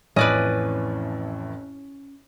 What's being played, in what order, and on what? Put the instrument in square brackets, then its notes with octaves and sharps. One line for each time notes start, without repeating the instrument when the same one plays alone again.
[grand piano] A1 F2 A2 [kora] C#4 [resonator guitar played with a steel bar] B4 D5 D#5